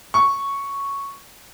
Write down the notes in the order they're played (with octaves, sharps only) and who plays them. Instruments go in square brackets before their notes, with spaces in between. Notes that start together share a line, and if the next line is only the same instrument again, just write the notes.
[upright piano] C#6